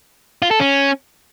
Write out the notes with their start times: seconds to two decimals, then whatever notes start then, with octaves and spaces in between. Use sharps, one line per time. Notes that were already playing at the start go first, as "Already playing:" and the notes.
0.42 F4
0.51 A4
0.60 C#4